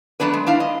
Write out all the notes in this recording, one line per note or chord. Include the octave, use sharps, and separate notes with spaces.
F#3 A3 B3 D4 B4
G#3
D4 E4 F5
D#5